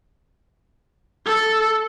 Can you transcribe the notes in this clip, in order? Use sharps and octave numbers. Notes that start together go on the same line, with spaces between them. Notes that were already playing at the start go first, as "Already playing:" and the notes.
A4